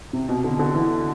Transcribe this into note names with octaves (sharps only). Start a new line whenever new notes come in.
C3
B2
D3
D3
E3